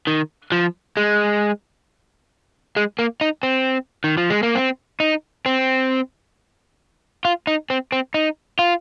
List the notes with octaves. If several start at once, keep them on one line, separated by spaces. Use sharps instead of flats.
D#3
F3
G#3
G#3
A#3
D#4
C4
D#3
F3
G#3
A#3
C4
D#4
C4
F4
D#4
C4
C4
D#4
F4